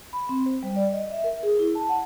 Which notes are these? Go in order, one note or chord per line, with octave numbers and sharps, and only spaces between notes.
B5
C4
C5
G3
D5
D#5
E5
A#4
G#4
E4
A5
F#5